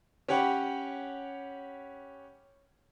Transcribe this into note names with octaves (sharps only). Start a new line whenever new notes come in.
C#4 G4 C#5 F#5 G5 B5